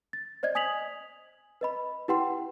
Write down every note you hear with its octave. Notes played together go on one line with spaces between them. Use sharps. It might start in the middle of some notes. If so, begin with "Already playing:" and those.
A6
C5 D5 D#5 G#6
G#5 D#6 G#6 B6 F7 F#7
B4 D#5 B5
E4 G4 B4 F#5 G5 C6